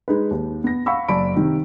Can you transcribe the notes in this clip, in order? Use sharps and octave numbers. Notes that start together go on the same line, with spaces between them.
G#3 D#4 B4
D#2
B3 A#6
F5 F#5 B5 C#6 E6
F#1 D5 A5 B5 D7
C3 D#3 D#4